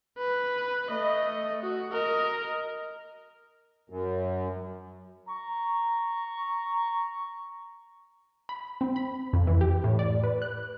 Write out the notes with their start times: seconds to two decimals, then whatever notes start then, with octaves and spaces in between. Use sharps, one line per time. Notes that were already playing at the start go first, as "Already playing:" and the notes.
0.18 B4
0.89 A3 D#5
1.63 F#4
1.92 A#4 D#5
3.90 F#2
5.29 A#5 C#6
8.49 B5
8.81 C4
8.96 B5
9.33 F2
9.47 E3
9.61 G4
9.84 A2
9.99 D5
10.23 B4
10.42 F#6